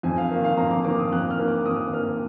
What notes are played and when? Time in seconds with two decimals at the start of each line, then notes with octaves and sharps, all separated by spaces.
0.03 F2 G#5
0.18 F5
0.31 D#3 A#3 A#4
0.44 F5
0.57 F2 A#5
0.71 D6
0.85 D#3 A#3 D6
0.99 D#6
1.11 F2 F#6
1.31 F6
1.39 D#3 A#3
1.48 D6
1.66 F2 D#6
1.94 D#3 A#3 F6